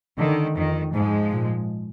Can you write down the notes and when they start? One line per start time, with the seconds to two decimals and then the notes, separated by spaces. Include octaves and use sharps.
0.18 D3 D#3
0.56 F2 D#3
0.94 G#2 F3 G#3
1.31 A#2